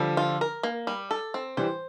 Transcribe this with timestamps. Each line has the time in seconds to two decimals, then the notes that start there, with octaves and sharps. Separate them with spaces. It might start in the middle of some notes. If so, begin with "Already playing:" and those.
Already playing: D3 F3 G3
0.17 F4
0.41 A#4
0.63 A#3
0.87 G3
1.11 A4
1.34 C4
1.57 E3 G3 C5